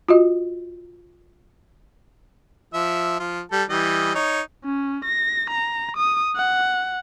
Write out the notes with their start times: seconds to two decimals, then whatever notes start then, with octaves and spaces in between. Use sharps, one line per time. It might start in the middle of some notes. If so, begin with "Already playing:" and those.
0.09 F4 F#4 D#5
2.74 F3 E5
3.20 F3 F4
3.52 G3 A4
3.70 E3 G3 D#5
4.15 D#4 C#5
4.65 C#4
5.05 A#6
5.51 A#5
5.97 D#6
6.36 F#5